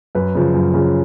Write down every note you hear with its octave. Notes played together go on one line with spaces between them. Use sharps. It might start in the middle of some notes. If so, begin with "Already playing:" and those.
F#2 B4
C#3 F3
F#2
C#3 F3